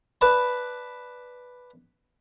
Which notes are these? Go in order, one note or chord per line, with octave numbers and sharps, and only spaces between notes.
B4 D5 A5 B5